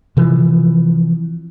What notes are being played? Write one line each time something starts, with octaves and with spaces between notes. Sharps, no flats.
C3 E3 F3